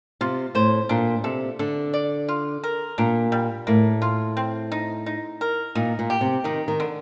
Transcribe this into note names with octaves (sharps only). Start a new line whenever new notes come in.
C3 F4
A2 C5
A#2 D4
C3 A4
D3 A4
D5
F4
A#4
A#2 D4
G3
A2 A#3
F4
C4
D#4
D#4
A#4
A#2 D#4
A#2
G4
C3
D#3 D#4
D#3
D3